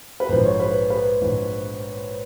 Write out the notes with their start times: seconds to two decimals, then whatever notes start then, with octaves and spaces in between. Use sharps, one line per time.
0.20 B4
0.29 A#1 G#2 F3 C5
0.45 C#5
0.52 C5
0.60 B4
0.90 B4
1.21 A#1 G#2 F3